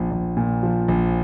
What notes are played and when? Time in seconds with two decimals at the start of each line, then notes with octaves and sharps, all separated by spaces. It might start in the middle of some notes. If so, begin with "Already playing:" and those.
Already playing: A#1 F3
0.11 A#1
0.37 A#2
0.63 F3
0.88 A#1